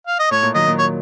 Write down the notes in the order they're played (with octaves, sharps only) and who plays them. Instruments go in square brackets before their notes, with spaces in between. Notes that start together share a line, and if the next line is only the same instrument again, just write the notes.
[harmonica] F5
D#5
[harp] A2 [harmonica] C#5
[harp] A#2
[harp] D#3 F#3 [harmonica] D#5
[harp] A#2
[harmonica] C#5